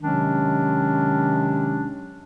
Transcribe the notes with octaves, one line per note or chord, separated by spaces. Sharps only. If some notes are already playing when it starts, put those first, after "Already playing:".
C3 D#3 F#3 G#3 C#4 D4